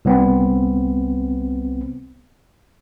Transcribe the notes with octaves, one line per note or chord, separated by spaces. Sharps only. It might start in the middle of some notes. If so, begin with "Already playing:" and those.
C2 B3 C4